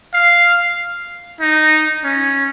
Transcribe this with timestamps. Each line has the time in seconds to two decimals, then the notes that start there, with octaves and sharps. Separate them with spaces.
0.14 F5
1.41 D#4
2.04 C#4